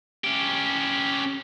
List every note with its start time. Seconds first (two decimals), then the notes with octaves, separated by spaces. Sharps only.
0.24 C#4 G4